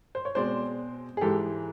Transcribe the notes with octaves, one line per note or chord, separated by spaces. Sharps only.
C5
C#5
B2 G#3 C4 C5 D5
G#4
G#2 E3 G#3 G4 A4